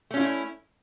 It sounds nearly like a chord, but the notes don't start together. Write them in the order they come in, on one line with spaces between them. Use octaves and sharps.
A3 C#4 F4 E4